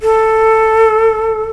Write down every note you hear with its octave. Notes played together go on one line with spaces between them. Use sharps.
A4